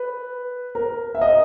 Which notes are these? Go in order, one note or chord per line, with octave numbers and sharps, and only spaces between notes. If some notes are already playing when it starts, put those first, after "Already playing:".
Already playing: B4
A#4
E5
D#5